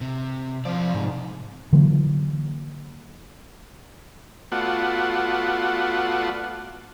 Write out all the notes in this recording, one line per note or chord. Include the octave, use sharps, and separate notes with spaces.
C3
C3 F3 D5
G#2
D3 E3 F#3 A#3
A3 B3 F4 F#4 D5 F#5